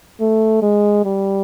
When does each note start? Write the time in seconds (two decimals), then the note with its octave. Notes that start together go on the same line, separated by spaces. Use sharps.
0.20 A3
0.62 G#3
1.05 G3